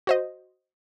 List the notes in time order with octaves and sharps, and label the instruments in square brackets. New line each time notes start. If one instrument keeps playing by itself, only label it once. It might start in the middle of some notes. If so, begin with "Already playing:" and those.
[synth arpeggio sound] F#4 C5 D#5